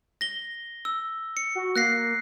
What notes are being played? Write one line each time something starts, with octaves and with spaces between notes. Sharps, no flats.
A#6 G7
E6
C#7
F#4
A#3 F#6 A#6 C7